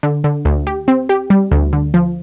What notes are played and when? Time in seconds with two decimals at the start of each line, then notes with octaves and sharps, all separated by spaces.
0.03 D3
0.24 D3
0.45 D2
0.67 G4
0.88 C4
1.09 G4
1.30 G3
1.51 D2
1.73 D3
1.94 F3